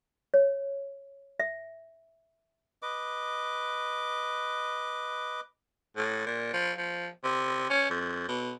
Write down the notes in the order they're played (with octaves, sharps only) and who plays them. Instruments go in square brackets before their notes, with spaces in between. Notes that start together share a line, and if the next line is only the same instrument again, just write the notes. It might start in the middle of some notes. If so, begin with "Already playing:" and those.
[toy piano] C#5
E5
[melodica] B4 D#5 D6
[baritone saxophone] A2
A#2
F3
F3
C3
C#4
F2
B2